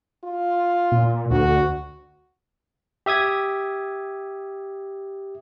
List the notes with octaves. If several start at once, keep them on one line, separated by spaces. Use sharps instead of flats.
F4
A#2
D2 F#4
G4 E5 D#6 G#6